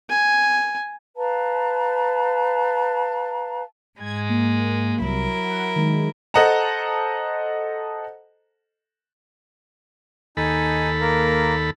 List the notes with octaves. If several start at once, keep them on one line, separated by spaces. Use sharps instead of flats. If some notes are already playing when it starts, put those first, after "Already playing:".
G#5
B4 F5 A5 A#5
G#2 G#3 G#6
A#3
C2 F#3 E4 A#4
F#5
D#3 G#3
A4 C5 D#5 F#5 A5 A#5
D#2 D#4 A4 G#5 B5
A#3 A#4